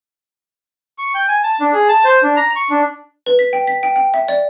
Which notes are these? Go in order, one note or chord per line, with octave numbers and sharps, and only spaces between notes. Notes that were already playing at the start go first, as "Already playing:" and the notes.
C#6
G5
G#5
A5
D4
G#4
A5
C5
D4
A#5
C#6
D4
B4
B6
G5
B6
G5
G5
E5
D5